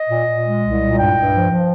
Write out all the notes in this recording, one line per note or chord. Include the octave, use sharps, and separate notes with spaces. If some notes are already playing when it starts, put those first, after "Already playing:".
Already playing: D#5
A#2
A#2
G#3
C2
A#2
G2 G5
G2
F3
F3